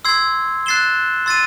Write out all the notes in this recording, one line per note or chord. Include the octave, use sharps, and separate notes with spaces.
C6 E6 G#6 C7
F#6 A6 C7 E7 G7
C6 E6 A6 C7 D#7